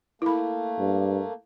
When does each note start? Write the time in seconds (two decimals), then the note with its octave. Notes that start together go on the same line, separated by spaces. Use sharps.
0.22 A3 A#3 E4 B5
0.79 G2